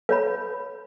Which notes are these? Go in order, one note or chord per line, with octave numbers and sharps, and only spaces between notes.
B4 C#5 B5